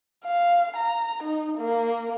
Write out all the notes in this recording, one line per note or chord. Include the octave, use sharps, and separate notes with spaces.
F5
A#5
D#4
A#3